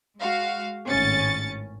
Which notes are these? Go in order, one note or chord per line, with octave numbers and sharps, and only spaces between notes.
G#3 F#4 F5
G#1 A2 C#4 A6 C#7